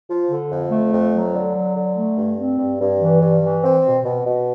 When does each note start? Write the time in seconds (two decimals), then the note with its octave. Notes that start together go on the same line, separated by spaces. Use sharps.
0.09 F3
0.30 D3
0.51 F2
0.71 A3
0.91 F2
1.13 F#3
1.34 D3
1.54 F#3
1.75 D3
1.96 A3
2.17 G2
2.39 C4
2.58 G2
2.80 G2
3.01 E3
3.21 G2
3.42 E3
3.63 C4
3.85 B2
4.05 B2
4.26 B2